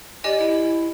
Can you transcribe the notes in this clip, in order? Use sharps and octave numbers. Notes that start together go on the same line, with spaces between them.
G4 D5 D#5 G#5
E4